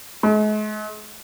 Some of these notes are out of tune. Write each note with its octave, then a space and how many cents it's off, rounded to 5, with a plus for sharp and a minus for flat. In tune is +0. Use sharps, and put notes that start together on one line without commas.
G#3 +40